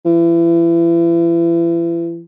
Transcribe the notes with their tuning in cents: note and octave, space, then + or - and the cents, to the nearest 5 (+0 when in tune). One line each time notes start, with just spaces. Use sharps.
E3 +35